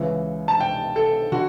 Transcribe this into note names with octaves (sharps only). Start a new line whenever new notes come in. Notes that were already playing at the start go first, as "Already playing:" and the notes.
Already playing: C#2 C#3 E3
A5
G5
A4
D3 F#4